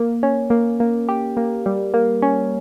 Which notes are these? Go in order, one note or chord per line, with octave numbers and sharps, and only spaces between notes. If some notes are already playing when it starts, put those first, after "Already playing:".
Already playing: A#3
C#4
A#3
A#3
G4
A#3
G3
A#3
C#4